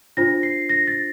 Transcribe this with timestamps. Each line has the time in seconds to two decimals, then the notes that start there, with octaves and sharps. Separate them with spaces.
0.17 D4 F4 C5 A#6
0.43 C7
0.69 A#6
0.87 A6